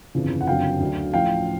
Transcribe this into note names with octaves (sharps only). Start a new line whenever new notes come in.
G1 F2 C#3 E3
F#5
F#1 F2 D3 F#3 F5 G5
D2 D3 F#3
A1 A2 F3 F5 G5